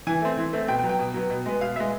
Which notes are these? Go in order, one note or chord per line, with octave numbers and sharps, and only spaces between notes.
E3 G#5
A3 C4
E3
A3 C4
B2 G5
G5
F#3 B3
G5
B2
F#3 B3
B2
G#3 B3
B2 F5
G#3 B3 E5